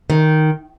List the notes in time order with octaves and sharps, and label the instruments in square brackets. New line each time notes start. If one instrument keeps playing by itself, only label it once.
[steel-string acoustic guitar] D#3